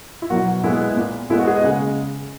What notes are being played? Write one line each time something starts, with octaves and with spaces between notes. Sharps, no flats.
E4
B2 F#3 A#3 F#4
A#2 G#3 B3 E4
A#2 A#3
A#2 G#3 B3 E4
F#4
G#4
D#5
C#3 G#3 F#5